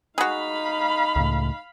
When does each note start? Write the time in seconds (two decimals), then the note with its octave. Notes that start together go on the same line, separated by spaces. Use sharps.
0.18 D#4 F#4 G#4 F5 B5
1.16 C#2 A2